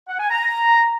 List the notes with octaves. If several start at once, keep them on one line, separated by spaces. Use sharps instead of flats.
F#5
G#5
A#5